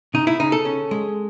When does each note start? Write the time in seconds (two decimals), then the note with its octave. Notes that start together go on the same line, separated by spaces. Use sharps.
0.14 C#3 D#4
0.27 E4
0.40 C#3 D#4
0.52 A4
0.65 C#4
0.91 G#3